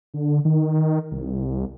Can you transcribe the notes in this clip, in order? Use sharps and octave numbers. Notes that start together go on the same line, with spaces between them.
D3
D#3
C2